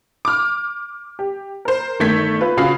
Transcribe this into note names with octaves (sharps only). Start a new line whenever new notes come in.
D6 F6
G4
A#4 C5
G1 D#3 A3 G6 G#6 B6
F4 B4
C#3 F4 F#4 F5 B5 C7